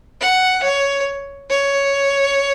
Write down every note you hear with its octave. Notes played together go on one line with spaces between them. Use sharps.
F#5
C#5
C#5